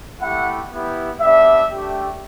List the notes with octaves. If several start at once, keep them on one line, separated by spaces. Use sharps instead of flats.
A3 E4 G4 F#5
B3 E4 G4
G3 B3 D4 G4 E5
A3 D4 G4